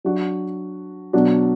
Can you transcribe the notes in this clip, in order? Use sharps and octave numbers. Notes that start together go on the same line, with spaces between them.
F#3 D4 F#4
B2 F#3 D4 F#4